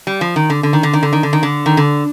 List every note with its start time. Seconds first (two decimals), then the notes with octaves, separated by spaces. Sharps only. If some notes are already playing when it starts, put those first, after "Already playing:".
0.07 G3
0.21 F3
0.36 D#3
0.50 D3
0.63 D3
0.73 D#3
0.83 D3
0.93 D#3
1.03 D3
1.13 D#3
1.23 D3
1.33 D#3
1.43 D3
1.66 D#3
1.77 D3